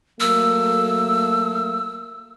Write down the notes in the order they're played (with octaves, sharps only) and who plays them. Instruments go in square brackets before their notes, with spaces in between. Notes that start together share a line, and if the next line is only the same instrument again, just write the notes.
[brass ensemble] F#3 A3 A#3 [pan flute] E6